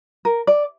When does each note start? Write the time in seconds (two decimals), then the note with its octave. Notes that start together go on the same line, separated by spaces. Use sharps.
0.25 A#4
0.47 D5